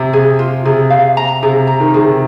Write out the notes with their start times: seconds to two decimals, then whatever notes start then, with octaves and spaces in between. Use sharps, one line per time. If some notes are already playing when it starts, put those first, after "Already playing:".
Already playing: C3
0.13 G#4
0.39 F4
0.65 C3 G#4
0.90 F5
1.17 A#5
1.43 C3 G#4
1.67 A#5
1.80 D#3
1.94 D#3 G#4
2.00 C3